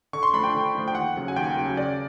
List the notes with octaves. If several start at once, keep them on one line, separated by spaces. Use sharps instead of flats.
D3 C#6
C6
F3 A3 D4 B5
G5
D3
F3 A3 D4
G5
D#2 F#5
C#3 F#3
G#5
D#2 G5
C#3 F#3
C#3 D5